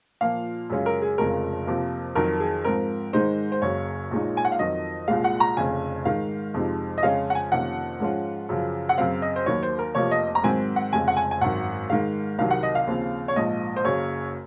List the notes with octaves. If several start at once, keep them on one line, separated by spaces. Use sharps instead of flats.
A#2 F3 A#3 F5
F#2 C#3 G#3 C#4 F4
A#4
G#4
F1 F2 C#3 F3 G#3 A#4
F2 C3 F3 A#3
F2 D#3 F#3 A#4
G#4
G#2 F3 C4 A#4
G#2 D#3 G#3 D#4 C5
C5
F#1 F#2 C#3 C#5
A#1 A#2 G#3 D#4
G#5
F#5
F5
F2 D#3 F#3 D#5
C2 A#2 G#3 F5
F#5
A#5
F1 F2 C#3 G#5
G#2 D#3 G#3 D#4 F5
F2 C3 F3 G#3 D#4
D#5
F2 C#3 G#3 C#4 F4 F5
F#5
G#5
F2 C3 D#3 A#3 C#4 F#5
G#2 F3 G#3 C#4 F4
F#2 C#3 F3
F#5
F#2 C#3 F#3 C4 F5
D#5
C5
D#2 D#3 F#3 C#5
C5
A#4
F1 F2 C3 F3 A#3 C#5
D#5
A#5
G#2 D#3 F#3 C4 G#5
F#5
F1 F2 C#3 G#3 G#5
F#5
G#5
G#5
G#1 F#2 D#3 F#5
G#2 D#3 G#3 F5
C2 C3 D#3 F#3 F5
F#5
D#5
F5
D#2 C#3 F3 C4
C#5
A#1 G#2 F3 D#5
C5
F#1 F#2 C#3 F#3 C#5